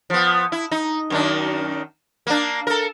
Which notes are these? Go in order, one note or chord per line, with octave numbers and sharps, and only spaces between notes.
F3 B3
E4
D#4
F#2 D#3 D4
A#3 D4
A4 A#4